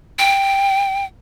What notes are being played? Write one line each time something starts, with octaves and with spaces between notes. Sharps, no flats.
G5